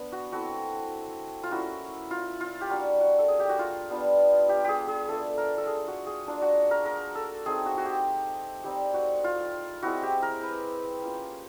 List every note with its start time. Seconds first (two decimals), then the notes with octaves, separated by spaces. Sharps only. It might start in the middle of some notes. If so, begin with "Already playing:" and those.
Already playing: B3 D4
0.12 F#4
0.32 A3 C4 E4 F#4
1.43 F4
1.51 A#3 C#4 E4 F#4
2.11 F4
2.41 F4
2.61 G4
2.70 G3 A#3 D4 F#4
3.01 F#4
3.19 A4
3.28 G#4
3.39 G4
3.49 F#4
3.59 F4
3.89 G3 B3 D4 F4
4.49 G4
4.64 G4 G#4
4.88 G#4
5.08 A3 D4 F4 A4
5.37 A#4
5.58 A4
5.67 G#4
5.88 F#4
6.06 G#4
6.27 A#3 D4 F4
6.42 F#4
6.71 A#4
6.86 A#4
7.15 A4
7.46 A3 C4 D#4 G#4
7.66 F#4
7.77 F#4
7.85 G4
8.64 G3 C4 D#4 G4
8.94 F#4
9.24 F4
9.82 G#3 C4 E4 F#4
10.03 G4
10.22 A#4
10.43 B4
11.01 A#3 C#4 F4